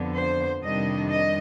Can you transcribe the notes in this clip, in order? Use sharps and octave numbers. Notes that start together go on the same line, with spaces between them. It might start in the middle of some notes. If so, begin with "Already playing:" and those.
Already playing: F2 D3 F3 B3
C5
F2 C3 D#3 G3 D4 D#5
D#5